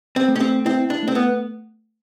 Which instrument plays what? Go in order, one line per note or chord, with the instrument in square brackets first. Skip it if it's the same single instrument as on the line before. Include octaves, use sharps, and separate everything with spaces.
[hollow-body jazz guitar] C4
[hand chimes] A3
[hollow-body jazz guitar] C#4
C4
[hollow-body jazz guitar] C4 [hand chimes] E4
[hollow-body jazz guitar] D4
[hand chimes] A3 [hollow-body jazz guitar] C4
[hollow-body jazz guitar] B3